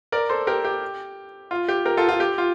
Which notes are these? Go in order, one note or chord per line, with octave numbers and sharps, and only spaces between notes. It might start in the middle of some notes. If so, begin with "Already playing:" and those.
A#4 D5
A4 C5
G4 A#4
G4
F4
G4
G4 A#4
F4 A4
F4 A4
G4
F4